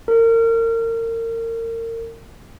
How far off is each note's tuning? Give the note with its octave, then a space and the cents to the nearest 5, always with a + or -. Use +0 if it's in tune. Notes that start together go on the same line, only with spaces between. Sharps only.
A#4 -30